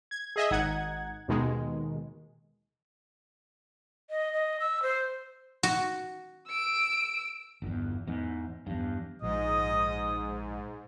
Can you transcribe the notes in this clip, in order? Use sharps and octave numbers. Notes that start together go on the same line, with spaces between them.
G#6
G#4 D#5 E5
G#1 D#4 F#5 G#6
D#2 B2 D#3 G#3
D#5
D#5
E6
C5
F#4
E6 D7
G1 E2
E2 G#2
E2 G2
A#1 G#2 D#5 D#6